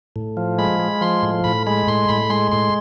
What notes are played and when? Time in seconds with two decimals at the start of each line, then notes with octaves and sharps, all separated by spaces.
0.16 A2
0.37 F3
0.58 G#3 B5
0.79 G#3
1.01 F3 C6
1.22 A2
1.44 A2 B5
1.67 G#3 B5
1.87 A2 C6
2.09 A2 B5
2.30 G#3 C6
2.51 A2 C6